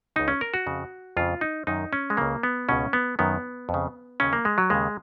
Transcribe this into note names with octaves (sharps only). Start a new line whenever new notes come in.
C#2 C#3 D#4
C#4
A#4
F#4
F2 C#3
F2 C#3 F4
D#4
F#2 D#3 D#4
C#4
G#3
C#2 C#3 A#3
B3
C#2 B2 C#4
B3
F#2 D#3 B3
F2
C#3
D#2 C#3 C#4
A#3
G#3
F#3
D#2 C#3 G#3